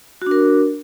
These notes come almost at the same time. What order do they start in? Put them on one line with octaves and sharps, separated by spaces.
F#4 D4 A#4